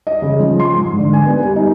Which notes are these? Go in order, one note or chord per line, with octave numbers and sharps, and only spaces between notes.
D#5
C#3
F3
C6
G#2
D3
G#5
B3
G3
D#4